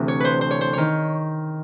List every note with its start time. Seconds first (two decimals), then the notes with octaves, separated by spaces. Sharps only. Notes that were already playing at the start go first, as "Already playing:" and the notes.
Already playing: D2 C3 E3
0.08 C#5
0.20 B4 C5
0.41 C5
0.51 C#5
0.61 C5
0.73 D#3 C#5